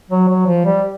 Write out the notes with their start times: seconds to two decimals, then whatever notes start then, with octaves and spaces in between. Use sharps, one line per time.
0.11 F#3
0.29 F#3
0.47 F3
0.65 G3